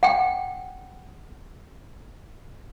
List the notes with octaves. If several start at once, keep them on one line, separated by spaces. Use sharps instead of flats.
F#5 G5